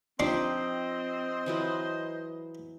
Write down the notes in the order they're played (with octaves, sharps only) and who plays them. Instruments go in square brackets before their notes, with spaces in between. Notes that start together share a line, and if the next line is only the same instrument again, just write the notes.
[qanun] F3 D#4 G4 [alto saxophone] C4 [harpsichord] D4 C6 [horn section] C5 D#5
[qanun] E3 F#3 B4